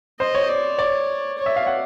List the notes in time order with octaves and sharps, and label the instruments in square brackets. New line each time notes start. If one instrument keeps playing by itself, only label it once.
[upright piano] C5 [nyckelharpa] D#5
[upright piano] C#5
[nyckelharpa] D5
[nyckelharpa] C#5 [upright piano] D5
[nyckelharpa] C#5
[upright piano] E5
F5
F#5